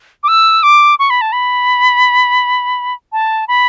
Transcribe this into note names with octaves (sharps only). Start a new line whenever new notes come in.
D6
E6
D6
C#6
B5
A5
B5
A5
B5